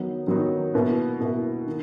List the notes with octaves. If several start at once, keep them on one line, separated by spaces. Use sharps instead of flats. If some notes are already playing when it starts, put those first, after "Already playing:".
Already playing: D#3 F#3 B3 D#4
D#3 F#3 B3 D#4
B2 A#3 E4 B4
B2 A#3 E4 B4
D#3